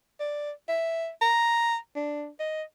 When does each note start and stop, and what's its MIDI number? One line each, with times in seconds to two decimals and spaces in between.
0.20 0.51 74
0.69 1.09 76
1.22 1.76 82
1.96 2.28 62
2.39 2.63 75